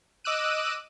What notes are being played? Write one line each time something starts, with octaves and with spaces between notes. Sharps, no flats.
D#5 D6 E6 F#6 D#7